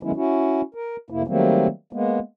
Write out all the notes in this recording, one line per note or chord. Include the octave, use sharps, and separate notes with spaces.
D#3 F#3 G#3 B3 C#4 E4
C#4 E4 F#4
A#4
F2 C3 A#3 E4
D#3 F#3 G3 A3 A#3 C4
G#3 A#3 B3